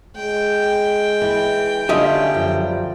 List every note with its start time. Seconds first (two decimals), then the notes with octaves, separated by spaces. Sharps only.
0.17 G#3 G5
1.22 E3
1.89 D3 G3 C#4 F4 D#5 E5
2.34 F#2 F3 F#3